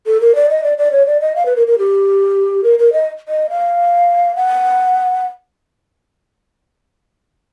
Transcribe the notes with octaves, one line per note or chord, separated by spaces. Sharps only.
A4
A#4
D5
D#5
D5
D5
C#5
D5
D#5
F5
B4
A#4
A#4
G4
A#4
A#4
D#5
D#5
F5
F#5